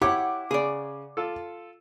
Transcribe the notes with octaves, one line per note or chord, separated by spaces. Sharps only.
E4 G4 C#5 F#5 D6
C#3 G#4 D5
F4 A4